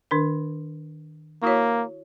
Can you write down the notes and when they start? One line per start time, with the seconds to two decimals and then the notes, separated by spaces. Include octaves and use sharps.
0.11 D#3 D4 A#4
1.43 A#3 E4 F#4 C#5